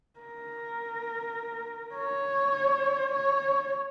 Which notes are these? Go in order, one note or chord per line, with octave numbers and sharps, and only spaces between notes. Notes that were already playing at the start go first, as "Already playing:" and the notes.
A#4
C#5
C#5